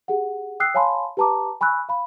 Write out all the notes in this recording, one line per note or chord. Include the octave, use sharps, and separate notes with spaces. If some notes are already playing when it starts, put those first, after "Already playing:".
G4 G#4 F#5
G5 D#6 E6 F#6 C7
C#5 F5 G#5 A5 B5 C6
G4 B4 A5 A#5 D6
G#5 B5 C#6 E6 F#6
F5 B5